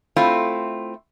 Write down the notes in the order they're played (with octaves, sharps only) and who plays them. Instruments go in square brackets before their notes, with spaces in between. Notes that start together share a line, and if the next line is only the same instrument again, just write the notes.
[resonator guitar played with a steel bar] A3 C4 E4 F4